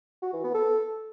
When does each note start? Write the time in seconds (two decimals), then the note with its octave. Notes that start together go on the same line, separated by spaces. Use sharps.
0.22 F#4
0.33 E3
0.44 B3
0.54 A4